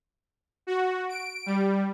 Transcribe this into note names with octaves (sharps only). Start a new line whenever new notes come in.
F#4
D7
G3